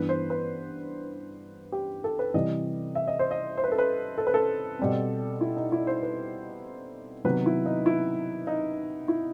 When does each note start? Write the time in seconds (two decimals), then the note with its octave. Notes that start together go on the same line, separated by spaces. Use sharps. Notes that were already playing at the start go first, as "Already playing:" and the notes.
Already playing: G2 E3 B3 B4
0.09 C5
0.30 B4
1.72 G4
2.04 A4
2.19 B4
2.34 C3 E3 G3 D#5
2.95 E5
3.08 D#5
3.19 C5
3.31 D#5
3.57 C5
3.64 B4
3.72 A4
3.78 B4
4.18 A4
4.27 B4
4.34 A4
4.79 B2 G3 C4
5.41 E4
5.56 D#4
5.72 E4
5.87 C5
6.02 B4
7.24 C3 D#3 F#3 B3 B4
7.46 E4
7.66 D#4
7.86 E4
8.47 D#4
9.08 E4